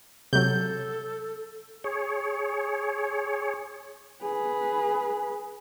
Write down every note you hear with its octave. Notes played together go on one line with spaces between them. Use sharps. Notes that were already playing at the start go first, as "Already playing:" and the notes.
C3 F#3 A4 G6
G#4 C#5
G#4 B4